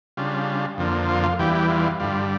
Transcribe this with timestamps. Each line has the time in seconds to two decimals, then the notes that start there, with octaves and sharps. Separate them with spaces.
0.17 C#3 G3 D4 F4
0.78 F2 D3 F3 A#3
1.09 F4
1.23 F4
1.39 E2 E3 G3 G4
1.55 G4
1.70 F4
2.00 G2 D3 G3 F4